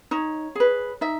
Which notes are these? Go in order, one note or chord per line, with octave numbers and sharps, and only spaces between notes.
D#4 C#5
G#4 B4
D#4 E5